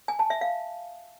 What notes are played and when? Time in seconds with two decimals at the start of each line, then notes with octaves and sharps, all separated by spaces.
0.08 G#5
0.19 A5
0.30 E5
0.41 F5